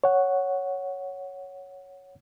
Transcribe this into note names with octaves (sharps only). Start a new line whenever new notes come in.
C#5 F#5